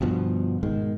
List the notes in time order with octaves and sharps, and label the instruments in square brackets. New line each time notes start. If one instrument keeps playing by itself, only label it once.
[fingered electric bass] G1 G2 B2 F3
G#2 B2 D#3 G#3